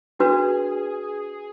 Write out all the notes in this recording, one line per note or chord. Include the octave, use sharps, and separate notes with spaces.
D4 F#4 G#4 B4